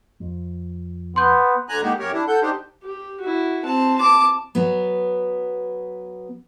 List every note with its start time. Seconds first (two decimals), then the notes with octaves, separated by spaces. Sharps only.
0.20 F2
1.16 B3 C6 G6
1.69 D2 D3 G#5 A#5 F#6
1.82 G#3 A#3 D#4 F#4 G4
1.99 F#2 G4 A#4 C#5
2.13 D4 E4
2.28 A4 F#5 G6
2.42 D4 D#4 G4 C5
2.82 G4
3.20 E4 F#4
3.65 C4 A5
3.98 A5 D6
4.55 F#3 B3